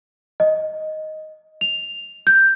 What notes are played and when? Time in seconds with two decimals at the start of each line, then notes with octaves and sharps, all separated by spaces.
0.40 D#5
1.61 F7
2.27 G6